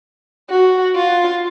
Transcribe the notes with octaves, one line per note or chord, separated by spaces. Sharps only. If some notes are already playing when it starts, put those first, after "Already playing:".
F#4
F4